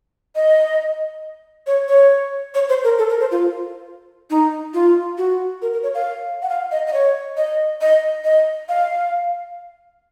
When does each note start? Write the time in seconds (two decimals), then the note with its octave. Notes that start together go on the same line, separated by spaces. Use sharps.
0.35 D#5
1.67 C#5
1.89 C#5
2.55 C#5
2.69 C5
2.84 A#4
2.99 A4
3.09 A#4
3.20 C5
3.31 F4
4.30 D#4
4.74 F4
5.18 F#4
5.62 A#4
5.73 A#4
5.83 C#5
5.95 F5
6.42 F#5
6.49 F5
6.72 D#5
6.87 D#5
6.93 C#5
7.37 D#5
7.81 D#5
8.24 D#5
8.69 F5